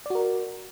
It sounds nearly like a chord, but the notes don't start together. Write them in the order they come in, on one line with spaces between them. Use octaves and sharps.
D5 F#4 A#4